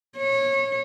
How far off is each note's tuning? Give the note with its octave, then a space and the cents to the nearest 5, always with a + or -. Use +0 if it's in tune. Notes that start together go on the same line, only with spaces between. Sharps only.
C#5 -25